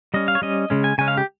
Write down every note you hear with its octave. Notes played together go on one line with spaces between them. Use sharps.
G3 C#4 D#5
F5
C#5
G3 C#4 D#5
C#3 G#3 C#4
G#5
C#3 G#3 C#4 G#5
F5
G4